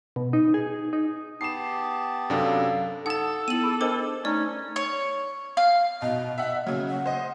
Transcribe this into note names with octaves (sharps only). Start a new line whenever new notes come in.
B2
D#4
G#4
D#4
B3 G4 A5 D#6 C7 E7
F#2 C3 D4 A4 F5
D#4 A4 F#5 A5 D#6
B3 E4 D#7 F#7
G#4 B5 E6
D4 A#4 C5 D#5 D6
A3 C#4 D#4 D5 A#5
C#5
F5
B2 D#5
E5 F#5
C#3 F#3 A#3
F#5
C5 D#5